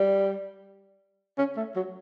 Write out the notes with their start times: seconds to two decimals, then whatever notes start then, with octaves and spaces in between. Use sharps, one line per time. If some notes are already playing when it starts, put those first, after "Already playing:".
Already playing: G3
1.38 C#4
1.57 A3
1.76 F#3